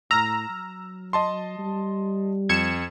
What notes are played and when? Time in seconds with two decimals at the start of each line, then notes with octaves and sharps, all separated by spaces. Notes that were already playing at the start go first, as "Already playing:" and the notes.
0.11 A2 A#5 E6 F6
0.49 F#3
1.13 D#5 A5 C6
1.58 G3
2.49 F2 G#6 C#7 E7